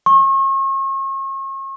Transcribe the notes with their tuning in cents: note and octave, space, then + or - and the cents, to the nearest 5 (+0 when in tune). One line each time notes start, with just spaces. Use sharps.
C#6 -40